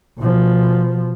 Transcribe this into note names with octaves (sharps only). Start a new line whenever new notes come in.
B2 F3